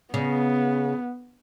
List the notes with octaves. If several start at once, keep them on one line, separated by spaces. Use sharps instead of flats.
C#3 B3